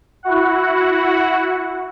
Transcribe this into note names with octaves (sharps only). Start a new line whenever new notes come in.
E4 F#4 F#5